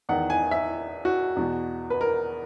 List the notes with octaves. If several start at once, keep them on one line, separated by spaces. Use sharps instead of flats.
E2 D#3 F#5
G#5
E5
F#4
E2 B2
B4
A#4